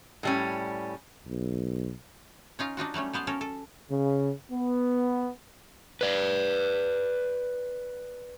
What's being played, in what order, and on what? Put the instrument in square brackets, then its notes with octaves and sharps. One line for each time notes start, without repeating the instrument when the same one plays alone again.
[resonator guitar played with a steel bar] A2 G3 C#4
[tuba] B1
[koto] C#4 D#4 F4 F5
D4 D#4 F4 F#4
F#3 G3 A3 C#4
F#3 B3 C5 F5
C#4 A4 A#4
A4
[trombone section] C#3
B3
[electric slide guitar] B4 D5